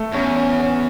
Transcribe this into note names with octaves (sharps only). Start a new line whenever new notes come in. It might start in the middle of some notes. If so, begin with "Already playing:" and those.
Already playing: A3
E2 C#4
C#4
C#4